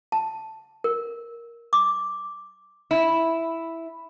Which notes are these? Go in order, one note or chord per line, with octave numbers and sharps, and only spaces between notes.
A5
A#4
D6
E4